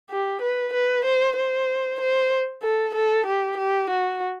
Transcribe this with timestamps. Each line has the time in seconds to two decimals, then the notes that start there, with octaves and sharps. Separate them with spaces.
0.11 G4
0.42 B4
0.73 B4
1.05 C5
1.37 C5
2.01 C5
2.63 A4
2.95 A4
3.26 G4
3.58 G4
3.90 F#4